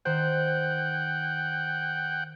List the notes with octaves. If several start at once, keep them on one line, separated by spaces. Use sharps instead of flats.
D#3 C5 F#5 G5